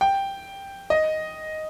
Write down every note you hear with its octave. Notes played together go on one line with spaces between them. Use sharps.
G5
D#5